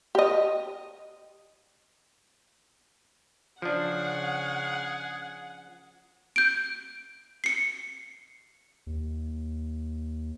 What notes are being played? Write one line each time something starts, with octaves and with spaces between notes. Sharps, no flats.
G4 D#5
C#3 F3 D4 G#4 F#5
G6 D7
C7 C#7
D#2